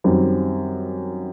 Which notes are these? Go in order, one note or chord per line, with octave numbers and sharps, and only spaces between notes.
F#2 D#3 G3 C4